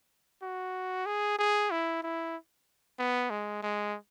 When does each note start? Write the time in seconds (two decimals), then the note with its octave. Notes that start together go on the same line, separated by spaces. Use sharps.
0.43 F#4
1.06 G#4
1.39 G#4
1.71 E4
2.03 E4
2.99 B3
3.30 G#3
3.63 G#3